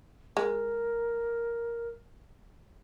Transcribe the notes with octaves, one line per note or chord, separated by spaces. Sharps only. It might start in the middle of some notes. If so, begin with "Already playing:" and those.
G#3 A#4